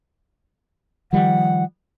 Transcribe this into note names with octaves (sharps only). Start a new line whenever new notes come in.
D#3 F3 G3 F#5